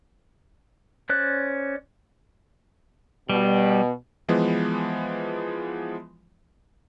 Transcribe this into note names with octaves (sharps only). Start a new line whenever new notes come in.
C#4 C5 D5 F#6
B2 G3
E3 F3 G#3 B3